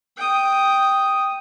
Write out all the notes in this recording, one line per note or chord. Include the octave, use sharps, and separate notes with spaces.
G5 D#6